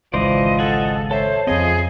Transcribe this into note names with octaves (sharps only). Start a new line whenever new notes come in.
G#1 C#2 E3 F3 C5 D5 D#5
G#4 A4 D#5 F#5
A4 C5 C#5 E5
F2 C#3 F3 C4 G#4 D#5